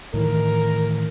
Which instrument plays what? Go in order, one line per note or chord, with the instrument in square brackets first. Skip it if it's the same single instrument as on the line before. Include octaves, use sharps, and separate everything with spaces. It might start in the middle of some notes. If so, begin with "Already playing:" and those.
[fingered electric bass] A2 D#3 E3 [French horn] A#4